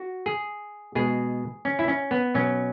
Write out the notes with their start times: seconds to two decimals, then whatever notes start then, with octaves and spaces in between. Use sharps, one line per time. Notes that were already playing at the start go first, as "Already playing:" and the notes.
Already playing: F#4
0.26 G#4
0.95 B2 G#3 G#4
1.65 C#4
1.79 E4
1.88 C#4
2.11 B3
2.34 B2 F#3 C#4